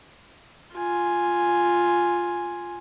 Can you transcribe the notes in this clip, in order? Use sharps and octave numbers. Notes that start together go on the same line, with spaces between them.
F4 G#5